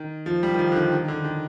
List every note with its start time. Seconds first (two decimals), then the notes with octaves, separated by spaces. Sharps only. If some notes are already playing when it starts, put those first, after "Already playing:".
Already playing: D#3
0.26 F3
0.43 G3
0.54 D#3
0.59 F3
0.72 D3
0.76 D#3
0.92 D#3
1.08 D3
1.24 D#3